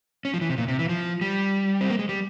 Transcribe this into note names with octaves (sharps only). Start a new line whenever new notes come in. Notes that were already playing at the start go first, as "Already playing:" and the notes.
C#4
F3
E3
C3
A#2
C3
E3
F3
G3
C4
A#3
G#3
G3